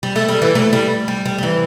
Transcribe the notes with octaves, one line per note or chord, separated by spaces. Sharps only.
G3
A3
G3
E3
A3
G3
G3
G3
G3
E3